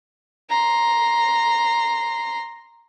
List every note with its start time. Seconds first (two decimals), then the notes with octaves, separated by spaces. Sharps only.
0.50 A#5 C6